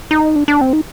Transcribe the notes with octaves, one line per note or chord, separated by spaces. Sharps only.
D#4
D4
D4
C4
D#4